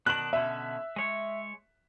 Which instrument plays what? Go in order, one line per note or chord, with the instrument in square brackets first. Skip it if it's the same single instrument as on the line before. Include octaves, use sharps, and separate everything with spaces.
[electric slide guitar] B2 D#3 D4 [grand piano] F#6 F#7
[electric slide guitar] B2 D3 C#4 [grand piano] E5
[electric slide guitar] G#3 C#5